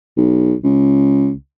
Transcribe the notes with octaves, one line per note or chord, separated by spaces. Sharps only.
B1
C#2